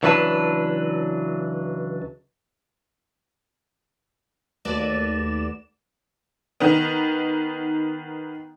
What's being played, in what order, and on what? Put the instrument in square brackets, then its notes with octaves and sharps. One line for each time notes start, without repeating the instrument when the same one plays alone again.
[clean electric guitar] C#2 E3 F#3 D4 B4 A5
[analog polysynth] D#2 D5 E7 [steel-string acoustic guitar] A3 F#4 B4
[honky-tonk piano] D#3 B3